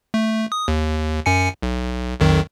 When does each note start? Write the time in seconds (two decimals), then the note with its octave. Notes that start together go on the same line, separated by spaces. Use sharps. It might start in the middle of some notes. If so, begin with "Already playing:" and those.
0.14 A3
0.52 D#6
0.68 D#2
1.26 F#2 G#5 C#7
1.63 B1
2.21 B1 F2 D#3